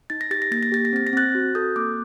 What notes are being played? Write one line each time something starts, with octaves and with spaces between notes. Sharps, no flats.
D#4 A6
A#6
G4 A6
A#6
A#3 A6
A#6
G4 A6
A#6
C4 A6
A#6
C4 F#6 A6
F#4
A4 D#6 G6
A#3 D6 F#6